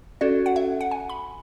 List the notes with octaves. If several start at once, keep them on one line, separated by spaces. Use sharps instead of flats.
C#4 F#4 A4 D5
F#5
E5
F#5
G#5
B5